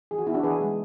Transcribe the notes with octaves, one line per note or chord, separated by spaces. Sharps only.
E3 G#4
F#4
B3 E4
D4 F#4
E3 G#4 B4
G#3